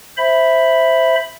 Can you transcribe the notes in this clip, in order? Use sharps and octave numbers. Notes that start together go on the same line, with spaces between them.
C5 E5 B5